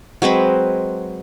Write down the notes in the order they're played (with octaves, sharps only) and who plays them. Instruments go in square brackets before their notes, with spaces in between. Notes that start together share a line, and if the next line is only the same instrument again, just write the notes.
[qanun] F#3 G#3 C4 B4